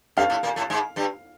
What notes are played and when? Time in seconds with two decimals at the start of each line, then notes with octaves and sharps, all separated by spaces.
0.17 G2 G3 F5
0.30 A2 A3
0.43 A#2 A#3
0.56 A2 A3
0.70 G#2 G#3
0.96 G2 G3